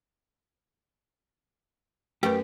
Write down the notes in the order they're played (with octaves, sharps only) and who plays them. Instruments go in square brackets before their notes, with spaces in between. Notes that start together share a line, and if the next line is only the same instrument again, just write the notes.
[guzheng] F#2 [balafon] A3 B4 [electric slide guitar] G4